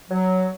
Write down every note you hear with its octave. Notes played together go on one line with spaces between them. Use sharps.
F#3